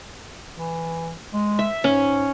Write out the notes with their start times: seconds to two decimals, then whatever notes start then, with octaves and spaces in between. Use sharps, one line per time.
0.55 E3
1.33 G#3
1.59 E5
1.84 G#2 C#4